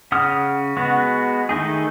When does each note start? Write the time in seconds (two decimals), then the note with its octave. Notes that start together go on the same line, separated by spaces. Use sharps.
0.12 C#3 F#5 D#6 F6
0.77 G#3 B3 F#4
1.49 D#3 A3 D#4 G#4